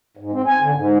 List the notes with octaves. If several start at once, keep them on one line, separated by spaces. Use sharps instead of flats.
G#2
C4
G#5
D3
G#2